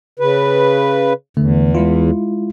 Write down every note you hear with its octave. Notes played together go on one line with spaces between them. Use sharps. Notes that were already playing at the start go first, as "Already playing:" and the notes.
C#3 B4
E2 D3 A3
G#3 E4 F4